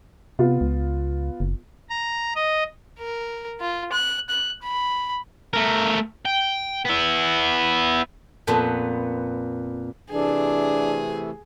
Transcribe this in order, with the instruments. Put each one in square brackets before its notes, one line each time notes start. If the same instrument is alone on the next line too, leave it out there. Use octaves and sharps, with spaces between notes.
[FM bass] C3 [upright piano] B3 F4
[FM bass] C#2
F#1
[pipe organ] A#5
D#5
[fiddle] A#4
F4
F#6
F#6
B5
[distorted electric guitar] A3 A#4
G5
B3 E4
[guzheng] F2 A#2 B3
[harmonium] C3 E3 A3 [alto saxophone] D4 [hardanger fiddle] G#4